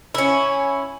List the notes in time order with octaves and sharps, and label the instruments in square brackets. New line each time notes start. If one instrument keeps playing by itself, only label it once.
[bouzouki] C#4 E4